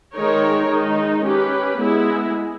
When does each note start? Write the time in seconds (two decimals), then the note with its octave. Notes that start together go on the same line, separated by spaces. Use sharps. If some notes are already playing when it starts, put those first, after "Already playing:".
0.15 D#3 G#3 D#4 A#4 C#5
0.69 D#3 G#3 D#4
1.24 C#4 G4 B4
1.78 G#3 B3 E4 G#4